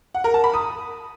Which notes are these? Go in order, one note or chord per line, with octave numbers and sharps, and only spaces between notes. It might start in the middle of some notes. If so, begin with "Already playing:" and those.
F#5
A#4
A5
B5
D#6